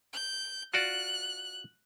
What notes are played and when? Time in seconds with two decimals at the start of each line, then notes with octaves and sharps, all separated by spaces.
0.13 G6
0.74 F4 F#4 D5 F#6